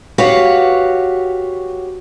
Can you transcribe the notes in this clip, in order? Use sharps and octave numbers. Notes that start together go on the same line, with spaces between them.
F#4 G4 B4 C#5 F5 F#5